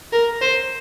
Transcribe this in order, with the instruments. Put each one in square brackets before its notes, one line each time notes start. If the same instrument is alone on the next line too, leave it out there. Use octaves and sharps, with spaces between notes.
[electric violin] A#4
C5